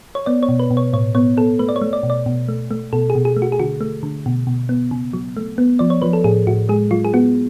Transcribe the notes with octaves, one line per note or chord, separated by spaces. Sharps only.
C#5
B3 D5
C#5
B2
B4
B2
C#5
A2 C#5
B3 C#5
B3 A4
A3 B4
D5
C#5
A3
D5
B2
D5
B2
A3
A3
B2 A4
G#4
B2
G#4
A3
F#4
G#4
D3 F#4
A3
D3
B2
B2
B3
C#3
F#3
A3
B3
F3 D5
C#5
F3 B4
A4
A2 G#4
A2 F#4
G#3 G#4
F#3 F4
G#4
B3 F#4